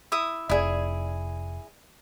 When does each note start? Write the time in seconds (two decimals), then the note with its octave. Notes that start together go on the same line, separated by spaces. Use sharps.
0.12 E4 E5 D#6
0.49 F1 E4 G#4 D5 E5 D#6